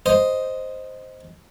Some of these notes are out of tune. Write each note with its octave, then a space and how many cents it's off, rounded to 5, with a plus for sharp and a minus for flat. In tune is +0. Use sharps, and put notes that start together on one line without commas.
C5 +0 D#5 +0